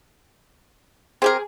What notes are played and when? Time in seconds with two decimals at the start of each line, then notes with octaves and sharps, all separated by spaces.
1.22 C4 G4 G#4 A#4